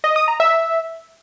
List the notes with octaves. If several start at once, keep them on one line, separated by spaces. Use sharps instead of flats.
D#5
D#6
A#5
E5